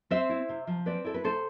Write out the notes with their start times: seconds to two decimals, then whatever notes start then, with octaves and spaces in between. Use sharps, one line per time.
0.11 C4 C5 E5
0.29 E4
0.49 C3
0.67 F3
0.86 C4 B4 D5
1.04 E4 A4
1.14 B4
1.24 C3 A4 C5